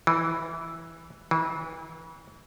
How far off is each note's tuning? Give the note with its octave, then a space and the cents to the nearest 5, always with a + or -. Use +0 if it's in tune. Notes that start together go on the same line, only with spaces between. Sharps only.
E3 -5
E3 -30